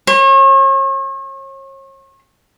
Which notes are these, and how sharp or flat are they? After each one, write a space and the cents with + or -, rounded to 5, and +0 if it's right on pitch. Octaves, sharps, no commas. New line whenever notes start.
C#5 -40